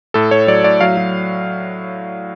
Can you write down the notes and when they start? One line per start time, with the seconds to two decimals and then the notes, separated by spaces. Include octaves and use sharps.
0.14 A2 A4
0.31 A2 C#5
0.47 F#3 D5
0.64 A2 D5
0.81 F#3 F5
0.97 F#3